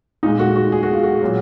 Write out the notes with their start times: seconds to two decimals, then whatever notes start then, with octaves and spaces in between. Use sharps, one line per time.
0.23 A#2 G#3 D#4
0.39 F#4
0.56 F#4
0.72 G#4
0.83 F#4
0.93 F4
1.03 F#4
1.21 A#2 F#3